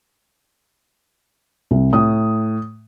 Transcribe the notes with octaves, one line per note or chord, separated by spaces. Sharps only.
C2
A2 D#6